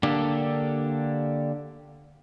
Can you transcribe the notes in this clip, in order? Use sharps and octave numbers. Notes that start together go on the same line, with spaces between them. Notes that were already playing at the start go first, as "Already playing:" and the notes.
D3 A#3 D4 G4 A4